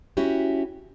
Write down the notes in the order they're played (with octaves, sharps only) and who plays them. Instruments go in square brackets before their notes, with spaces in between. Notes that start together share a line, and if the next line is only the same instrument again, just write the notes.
[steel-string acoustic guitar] C#4 E4 F#4 G4